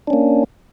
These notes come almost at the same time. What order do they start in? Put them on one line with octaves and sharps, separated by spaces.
D4 C#4 A#3